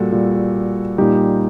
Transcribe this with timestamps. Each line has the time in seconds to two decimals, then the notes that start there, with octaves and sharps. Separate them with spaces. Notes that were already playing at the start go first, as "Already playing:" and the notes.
Already playing: A#2 G3 F#4 A4
0.12 A#2 G3
0.98 A#2 G3 D#4 G4